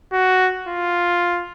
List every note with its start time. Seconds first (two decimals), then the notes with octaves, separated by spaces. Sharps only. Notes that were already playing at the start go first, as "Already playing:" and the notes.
0.13 F#4
0.68 F4